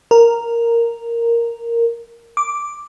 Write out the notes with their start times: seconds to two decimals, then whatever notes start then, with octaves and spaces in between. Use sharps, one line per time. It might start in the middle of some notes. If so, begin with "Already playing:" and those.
0.11 A#4
2.37 D6